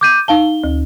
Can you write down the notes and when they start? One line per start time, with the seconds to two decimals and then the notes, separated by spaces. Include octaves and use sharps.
0.01 D6 G6 D#7
0.28 D#4 F5 A5 G7
0.64 D2